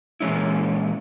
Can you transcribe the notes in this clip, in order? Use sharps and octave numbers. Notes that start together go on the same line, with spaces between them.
A#2 E3 G#3 C#4 E4